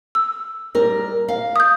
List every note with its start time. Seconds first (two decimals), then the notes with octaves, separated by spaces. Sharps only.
0.15 E6
0.75 G3 A#4
1.29 F5
1.56 D#6 G6